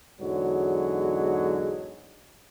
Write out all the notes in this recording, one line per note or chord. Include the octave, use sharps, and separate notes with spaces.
E2 G#2 D3 F#3 G#3